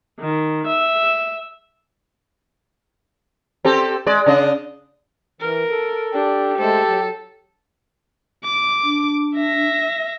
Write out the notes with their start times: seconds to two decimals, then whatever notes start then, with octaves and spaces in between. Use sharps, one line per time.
0.20 D#3
0.67 E5
3.65 C4 G4 A4
4.06 G#3 D5
4.26 C#3 D4 D#5
5.41 E3 A#4
5.70 A4
6.14 D4 G4
6.59 G#3 A3 A4 C5
6.87 F#3
8.44 D6
8.84 D4
9.37 E5 A#6